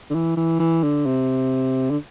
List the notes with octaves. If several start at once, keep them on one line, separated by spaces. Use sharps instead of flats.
D3
E3
E3
E3
D3
C3
D3